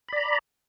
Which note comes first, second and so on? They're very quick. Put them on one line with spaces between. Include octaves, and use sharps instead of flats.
B5 D5 A#5